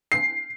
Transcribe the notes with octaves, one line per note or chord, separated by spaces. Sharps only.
C7